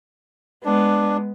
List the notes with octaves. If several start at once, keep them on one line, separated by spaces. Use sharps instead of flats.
G#3 B3 D4